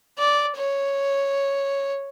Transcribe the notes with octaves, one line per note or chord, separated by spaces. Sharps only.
D5
C#5